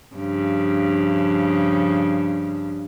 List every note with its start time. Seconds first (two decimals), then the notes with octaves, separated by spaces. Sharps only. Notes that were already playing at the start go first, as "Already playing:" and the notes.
0.16 G2 C#3 F3